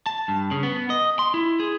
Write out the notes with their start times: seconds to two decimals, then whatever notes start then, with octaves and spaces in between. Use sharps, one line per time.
0.06 A5
0.28 G2
0.51 C#3
0.63 B3
0.90 D#5
1.19 C6
1.34 E4
1.60 G#4